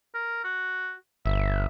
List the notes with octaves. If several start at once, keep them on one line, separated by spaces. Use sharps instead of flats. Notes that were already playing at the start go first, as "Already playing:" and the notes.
A#4
F#4
G1 E5